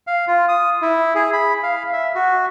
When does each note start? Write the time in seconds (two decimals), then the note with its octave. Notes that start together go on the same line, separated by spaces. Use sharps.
0.07 F5
0.28 F4
0.48 D#6
0.82 E4
1.15 G#4
1.33 B5
1.63 F5
1.93 E5
2.15 F#4